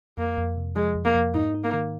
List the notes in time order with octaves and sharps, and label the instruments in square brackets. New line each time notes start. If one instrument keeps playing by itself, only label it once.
[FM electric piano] F2 [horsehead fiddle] A#3
[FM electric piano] F2
C3
[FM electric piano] F3 [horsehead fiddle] G#3
[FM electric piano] F2
[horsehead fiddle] A#3
[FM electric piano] F2
[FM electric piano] G#2 [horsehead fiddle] D#4
[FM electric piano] D#4
[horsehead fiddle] A#3
[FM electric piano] D#3